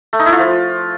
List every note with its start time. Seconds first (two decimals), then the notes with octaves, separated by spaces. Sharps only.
0.13 A3
0.19 D#4
0.26 E4
0.33 F4
0.39 F3